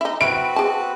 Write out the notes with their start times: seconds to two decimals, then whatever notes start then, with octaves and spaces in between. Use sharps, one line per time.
0.01 D#4 E4
0.21 C4 E4 F#4 B4 D7
0.56 G#4 A5